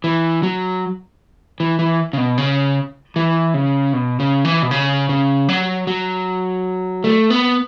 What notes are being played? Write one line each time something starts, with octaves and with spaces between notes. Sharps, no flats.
E3
F#3
E3
E3
C#3
B2
C#3
E3
C#3
B2
C#3
E3
B2
C#3
C#3
F#3
F#3
A3
B3